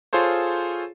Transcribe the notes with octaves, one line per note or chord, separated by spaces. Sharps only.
F4 G#4 A4 C5 C#5